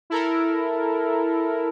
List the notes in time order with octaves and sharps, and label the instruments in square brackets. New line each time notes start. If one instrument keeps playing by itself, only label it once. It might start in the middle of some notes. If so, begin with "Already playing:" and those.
[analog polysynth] E4 A4 A#4